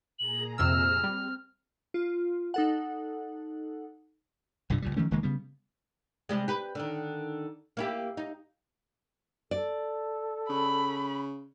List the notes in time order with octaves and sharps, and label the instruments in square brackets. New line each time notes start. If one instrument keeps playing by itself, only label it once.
[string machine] A#2 G#4 A#5 [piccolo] F#7
[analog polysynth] F2 C3 E6 [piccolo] F6
[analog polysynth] G3 [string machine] C4
[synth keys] F4
D#4 A4 F#5
[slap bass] C2 G2 A#2 D3
C#2 A#2 G3
D#3 F3 A3 C#4
F1 D#3 G#3 A#3
C#3 G3 B3
[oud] C3 G3 G#3
G4 B4
D3 D#3
A#3 E4 G4
D#4
[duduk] A4 [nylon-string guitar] D5
[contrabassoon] C#3 [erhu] B5